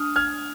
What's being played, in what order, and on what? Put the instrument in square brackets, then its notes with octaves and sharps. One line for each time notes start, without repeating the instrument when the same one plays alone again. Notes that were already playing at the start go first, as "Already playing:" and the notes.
Already playing: [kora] D4 [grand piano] D#6 F6
[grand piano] F6 G#6